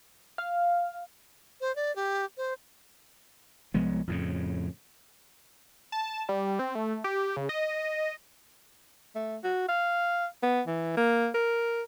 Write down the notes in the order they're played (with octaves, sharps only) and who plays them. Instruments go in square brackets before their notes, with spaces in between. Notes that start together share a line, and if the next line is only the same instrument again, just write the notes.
[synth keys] F5
[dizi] C5
D5
G4
C5
[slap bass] C2 F3 G#3 B3
F2 A2 C#3
[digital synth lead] A5
G3
C4
A3
G4
C#3
D#5
[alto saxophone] A3
F#4
F5
B3
E3
A#3
A#4